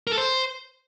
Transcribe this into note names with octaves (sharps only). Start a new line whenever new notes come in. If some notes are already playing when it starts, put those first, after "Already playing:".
A#4
A4
C5